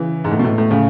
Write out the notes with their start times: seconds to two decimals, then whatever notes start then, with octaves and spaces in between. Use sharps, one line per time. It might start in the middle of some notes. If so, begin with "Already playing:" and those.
Already playing: C#3 E3
0.24 G#2
0.31 A2
0.39 B2
0.44 A2
0.58 A2
0.71 A2 C#3